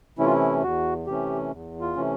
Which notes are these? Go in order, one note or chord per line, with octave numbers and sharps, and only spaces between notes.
C3 E3 A3 C#4 E4
F4
E4
E2 F#4
C3 E3 A3 C#4 G4
E2
F4
C3 E3 A3 C#4